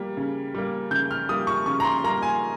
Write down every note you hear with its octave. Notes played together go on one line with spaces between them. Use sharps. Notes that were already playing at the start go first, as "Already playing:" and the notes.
Already playing: G3 A#3
C#3
G3 A#3
C#3 G6
F6
G3 A#3 D#6
C#6
C#3 C#6
A#5
C6
G3 A#3 A#5
G#5